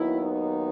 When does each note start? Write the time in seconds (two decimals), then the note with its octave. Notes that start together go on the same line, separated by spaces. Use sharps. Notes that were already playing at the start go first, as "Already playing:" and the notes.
Already playing: D#2 D#3 F#3 B3 E4
0.22 D#4